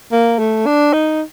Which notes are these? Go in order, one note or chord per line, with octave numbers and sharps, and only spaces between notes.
A#3
A3
D4
D#4